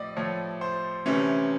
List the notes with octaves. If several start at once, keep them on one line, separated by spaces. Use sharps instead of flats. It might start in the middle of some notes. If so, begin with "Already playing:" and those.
Already playing: A2 F3 D5 D#5
A2 F3 A3 C#5
C5
D2 C3 E3 A3 C#4